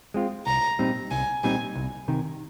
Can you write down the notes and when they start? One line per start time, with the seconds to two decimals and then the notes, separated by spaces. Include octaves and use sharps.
0.14 G#3 C4 F4
0.46 C2 A#5
0.79 A#2 G3 C4 D#4
1.11 C2 G#5
1.44 A#2 G3 C4 D#4 G#5
1.75 C2
2.08 C3 D#3